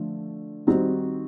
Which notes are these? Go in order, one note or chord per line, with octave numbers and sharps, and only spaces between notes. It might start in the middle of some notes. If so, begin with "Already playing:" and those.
Already playing: D3 F3 A3 D4
D#3 G3 C4 D#4 F#4